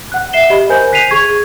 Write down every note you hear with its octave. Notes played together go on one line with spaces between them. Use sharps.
F#5 F#6
E5 C7 E7 G7
G4 D#5 B5
A#4 C5 G#5 G6
F#6 B6 C7 D#7 F7
G#4 C#6 G#6